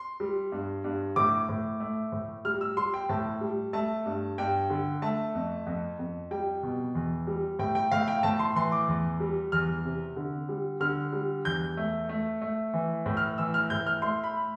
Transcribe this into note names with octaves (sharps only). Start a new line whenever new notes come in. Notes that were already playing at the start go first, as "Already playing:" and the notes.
Already playing: C6
G3
G2
G2
A2 D6
A2
A3
A2
G3 F6
E6
G3 C6
G5
A2 A5
G3
A3 A5
G2
G2 G5
D3
A3 A5
F2
F2
F2
G3 G5
B2
E2
G3
A2 G5
G5
A2 F5
G5
A2 A5
C6
E3 C6
D6
E2
G3
E2 F6
C3
D3
G3
D3 F6
G3
E2 G6
A3
A3
A3
E3
A2
F6
E3 E6
F6
A2 G6
F6
A3 C6
B5